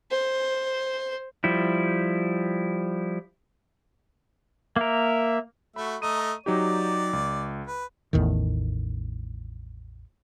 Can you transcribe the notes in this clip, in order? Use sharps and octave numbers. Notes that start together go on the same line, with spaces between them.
C5
F3 G3 E4
A#3 A#4 E5
A3 F#4 E5 B5
A3 D#5 A#5 D#7
F#3 D#4 G4 D5
C#2
B4
A1 E2 A2 D#3